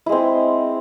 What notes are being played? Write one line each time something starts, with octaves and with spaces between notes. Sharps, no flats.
G#3 C4 E4